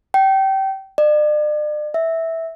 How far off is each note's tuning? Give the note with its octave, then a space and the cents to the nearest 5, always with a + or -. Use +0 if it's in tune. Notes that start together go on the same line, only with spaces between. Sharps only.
G5 -25
D5 +40
E5 -10